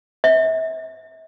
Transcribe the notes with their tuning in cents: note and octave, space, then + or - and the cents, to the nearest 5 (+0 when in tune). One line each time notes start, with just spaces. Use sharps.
E5 -35